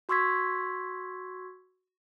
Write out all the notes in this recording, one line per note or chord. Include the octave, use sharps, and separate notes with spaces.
F#4 C6 C#6 E6 G#6 B6